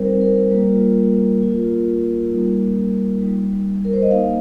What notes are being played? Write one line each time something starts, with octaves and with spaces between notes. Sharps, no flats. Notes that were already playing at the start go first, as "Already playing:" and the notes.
Already playing: G3 C4 D#4 A#4 C5
A#4
G3 A#3 F4
A#3 F4
G3 A#3 D#4
G3 D#4
A#4
C5
D#5
A#3 D#4 F5